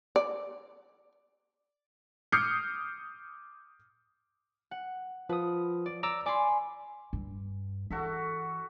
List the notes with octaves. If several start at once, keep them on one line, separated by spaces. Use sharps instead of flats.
D5
D6 D#6 F6 G6 C7 C#7
F#5
F3 B4 D#6
D5
D5 A#5 D6 E6
D5 G#5 B5 C6 D6
G2
E3 F#4 A4 E5